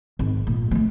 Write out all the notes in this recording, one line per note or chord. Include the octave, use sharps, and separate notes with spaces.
G#1
A#2
G#3 A3